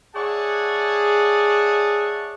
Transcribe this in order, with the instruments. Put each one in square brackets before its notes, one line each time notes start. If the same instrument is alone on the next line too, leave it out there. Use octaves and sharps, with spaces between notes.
[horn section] G#4 C#5 D5 E5 F#5 A5